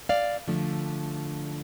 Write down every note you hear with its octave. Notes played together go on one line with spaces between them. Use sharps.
D5 F5
D3 F3 A3 D4